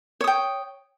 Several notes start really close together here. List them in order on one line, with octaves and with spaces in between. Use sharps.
C#5 D#6 G5